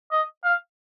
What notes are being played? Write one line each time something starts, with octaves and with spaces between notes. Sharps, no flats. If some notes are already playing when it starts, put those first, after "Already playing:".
D#5
F5